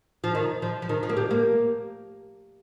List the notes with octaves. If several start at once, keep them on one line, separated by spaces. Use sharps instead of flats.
F3
D#3
F3
F3
D#3
F3
A#3
G3
A#3